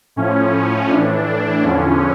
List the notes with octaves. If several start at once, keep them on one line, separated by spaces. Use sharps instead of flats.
A2 F3 C#4
A2 E3 D4
D4
E2 D3 F3 C#4